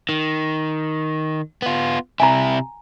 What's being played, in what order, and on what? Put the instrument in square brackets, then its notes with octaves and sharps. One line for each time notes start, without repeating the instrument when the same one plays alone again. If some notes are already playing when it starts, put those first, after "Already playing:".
[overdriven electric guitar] D#3
B3 F4
[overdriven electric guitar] C3 E4 [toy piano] G#5 A#5